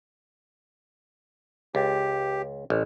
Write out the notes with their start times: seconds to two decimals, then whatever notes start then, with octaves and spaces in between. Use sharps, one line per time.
1.75 C#2 G4
2.70 A1